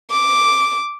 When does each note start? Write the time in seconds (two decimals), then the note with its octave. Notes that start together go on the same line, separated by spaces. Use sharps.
0.11 D6